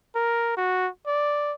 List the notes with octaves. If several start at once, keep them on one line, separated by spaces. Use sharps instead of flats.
A#4
F#4
D5